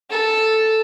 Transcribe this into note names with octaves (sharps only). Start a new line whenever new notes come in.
A4